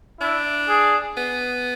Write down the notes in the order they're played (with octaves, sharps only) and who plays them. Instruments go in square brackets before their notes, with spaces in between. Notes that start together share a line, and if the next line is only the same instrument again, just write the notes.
[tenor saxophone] D4 [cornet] E4
[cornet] G#4
[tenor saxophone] B3